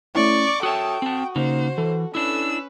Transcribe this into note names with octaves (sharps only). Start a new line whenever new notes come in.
A3 C#4 E4 D5 C#6 D6
F#4 A4 C#5 E5 G5 A5 C#6 D#6
C4 F#4 A5
C#3 A#3 D#4 C5
E3 A4
C#4 D4 E4 B4 E6